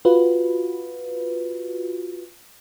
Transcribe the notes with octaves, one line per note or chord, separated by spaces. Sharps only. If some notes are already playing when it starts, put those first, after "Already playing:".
F4 F#4 B4